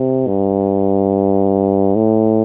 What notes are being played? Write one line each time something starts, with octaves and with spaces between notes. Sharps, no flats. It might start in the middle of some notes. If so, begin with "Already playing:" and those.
Already playing: C3
G2
A2